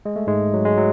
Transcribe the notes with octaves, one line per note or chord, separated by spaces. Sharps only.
G#3
A3
G#2 G#3
F#3
G#3
F#3